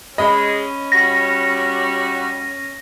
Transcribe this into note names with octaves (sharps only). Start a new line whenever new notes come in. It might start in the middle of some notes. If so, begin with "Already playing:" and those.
G#3 C#4 D#5 B5
G3 F#4 A#6